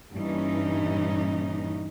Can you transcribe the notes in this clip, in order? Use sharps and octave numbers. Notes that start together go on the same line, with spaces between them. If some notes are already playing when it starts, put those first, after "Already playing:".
G2 A#2 E3 C#4 D#4